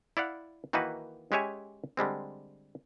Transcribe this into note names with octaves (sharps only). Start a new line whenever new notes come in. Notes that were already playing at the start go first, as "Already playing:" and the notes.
E4 D5 F5 F#5
D#3 E3 A#3 D#4 F#4 B4
G#3 C#4 G4 C#5 E5 G#5
D3 G3 G#3 C4